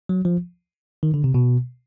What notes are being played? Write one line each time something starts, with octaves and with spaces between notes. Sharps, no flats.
F#3
F3
D#3
D3
C3
B2